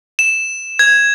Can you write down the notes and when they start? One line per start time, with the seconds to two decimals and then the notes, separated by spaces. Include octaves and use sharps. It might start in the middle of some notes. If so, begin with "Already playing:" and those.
0.19 E7
0.79 G#6